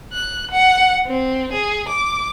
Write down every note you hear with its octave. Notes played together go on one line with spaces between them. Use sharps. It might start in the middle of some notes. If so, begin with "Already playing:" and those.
F#6
F#5
C4
G#4
D6